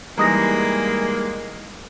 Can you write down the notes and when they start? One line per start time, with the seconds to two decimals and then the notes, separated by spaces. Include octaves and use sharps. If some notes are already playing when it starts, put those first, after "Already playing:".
0.18 E3 G3 G#3 A#3 D#4 A#5 D#6 A#6